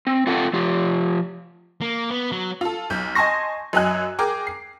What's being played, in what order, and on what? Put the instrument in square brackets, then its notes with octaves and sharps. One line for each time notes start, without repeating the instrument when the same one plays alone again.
[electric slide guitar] C4
C4 F4 A4 F#5 A5
F3 F4 G4
[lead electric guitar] A#3
B3
F#3
[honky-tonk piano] F4 A4
B1 G6
D#5 G#5 A5 C6 C#6 A#6
F#2 F#3 D#5 G#5 F#6
G#4 A#4 G5 D6
C7